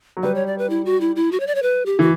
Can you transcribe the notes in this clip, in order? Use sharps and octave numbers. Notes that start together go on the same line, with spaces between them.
F#3
G3 B4
C#5
D5
B4
E4
F#4
E4
E4
F#4
C#5
D5
C#5
B4
G4
E3 F#4